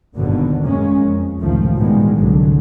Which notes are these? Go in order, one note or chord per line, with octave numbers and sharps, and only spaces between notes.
G1 D#2 G#2 B2 D3
F#2 G#3 A#3 C#4
F2
C#2 A2 C3 D#3 F3 A3
G#2 B2 D#3 E3 G3 G#3
C2 G#2 D3 F#3